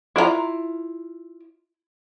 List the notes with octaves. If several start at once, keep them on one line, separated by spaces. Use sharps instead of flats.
E4 F4 F5 A#5